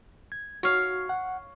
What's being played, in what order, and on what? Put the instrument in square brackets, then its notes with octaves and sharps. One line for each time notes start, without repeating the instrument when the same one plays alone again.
[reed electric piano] G#6
[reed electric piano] F#4 [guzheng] C#5 F5
[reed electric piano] F#5